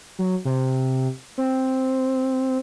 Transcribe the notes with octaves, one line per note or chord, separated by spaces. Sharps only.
F#3
C3
C4